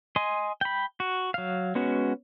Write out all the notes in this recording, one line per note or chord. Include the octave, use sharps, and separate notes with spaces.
D#5 G#5 C6
G5 B5
F#4
F#3 F5
G#3 B3 C#4 F#4